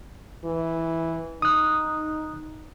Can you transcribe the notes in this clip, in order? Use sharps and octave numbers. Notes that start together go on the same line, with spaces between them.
E3
D#4 D#6 F#6